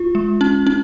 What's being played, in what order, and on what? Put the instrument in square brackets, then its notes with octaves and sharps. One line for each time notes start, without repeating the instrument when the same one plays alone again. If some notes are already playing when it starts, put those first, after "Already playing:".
Already playing: [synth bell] F4
G#3
C#4
C#4